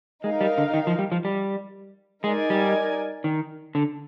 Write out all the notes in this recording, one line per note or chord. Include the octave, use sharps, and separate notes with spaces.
G#3 D#4 A#4 F5
G3
D3
D#3
F3
G3
F3
G3
G#3 D#4 A#4 D5 G#5
G3
D#3
D3